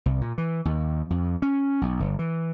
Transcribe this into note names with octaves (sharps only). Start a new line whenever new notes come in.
C2
A#2
E3
D#2
F2
C#4
B1
G1
E3